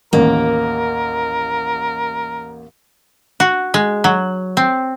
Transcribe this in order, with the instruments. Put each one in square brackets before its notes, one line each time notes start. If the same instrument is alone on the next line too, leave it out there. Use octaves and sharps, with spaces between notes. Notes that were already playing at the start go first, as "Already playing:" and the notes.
[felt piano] A1 D#2 [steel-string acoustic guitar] A#3 [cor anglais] A#4
[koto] F#4
G#3
F#3
C4